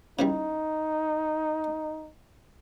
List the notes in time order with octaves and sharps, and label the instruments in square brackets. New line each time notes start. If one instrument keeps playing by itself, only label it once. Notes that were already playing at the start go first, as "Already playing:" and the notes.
[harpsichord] C#3 E3 G3 [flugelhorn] D#4